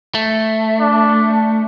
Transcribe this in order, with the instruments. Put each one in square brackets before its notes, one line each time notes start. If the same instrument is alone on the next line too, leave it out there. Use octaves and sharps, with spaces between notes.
[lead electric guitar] A3
[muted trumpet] D4